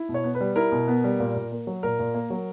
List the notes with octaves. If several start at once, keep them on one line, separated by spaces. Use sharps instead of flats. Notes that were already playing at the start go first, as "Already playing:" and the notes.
Already playing: E4
B2
C#5
B3
B4
G3
E4 A#4
B2
B3
G3
A#2
A#2
A#3
F#3
A#2 A#4
A#2
A#3
F#3